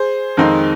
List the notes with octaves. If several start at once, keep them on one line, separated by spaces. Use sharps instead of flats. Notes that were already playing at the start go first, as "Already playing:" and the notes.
Already playing: G#4 C5
F2 D#3 G#3 C4 D#4